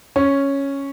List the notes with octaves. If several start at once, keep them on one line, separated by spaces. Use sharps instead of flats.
C#4